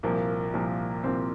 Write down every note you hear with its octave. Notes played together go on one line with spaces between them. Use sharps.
C2 A#2 F3 A#3
C2 A#2 F3
C2 A#2 F3 C4